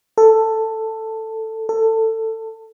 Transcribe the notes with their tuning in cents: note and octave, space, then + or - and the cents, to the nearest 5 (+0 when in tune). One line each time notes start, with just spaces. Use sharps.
A4 +10
A4 +20